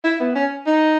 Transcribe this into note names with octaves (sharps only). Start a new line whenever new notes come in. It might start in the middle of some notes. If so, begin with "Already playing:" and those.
E4
B3
C#4
D#4